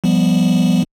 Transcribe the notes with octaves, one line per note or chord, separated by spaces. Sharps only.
F3 G3 B3